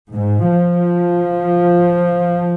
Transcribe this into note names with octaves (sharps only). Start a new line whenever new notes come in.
G#2
F3